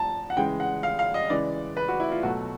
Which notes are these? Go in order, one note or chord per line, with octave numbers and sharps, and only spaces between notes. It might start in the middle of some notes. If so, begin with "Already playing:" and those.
Already playing: F3 A5 A#5
F#5
C#3 E3 G#3 G5
F#5
F5
F5
D#5
C#3 E3 G#3 D5
B4
F#4
E4
F4
B2 F#3 A3 F#4